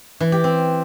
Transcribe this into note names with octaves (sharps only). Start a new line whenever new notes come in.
E3
G4
C4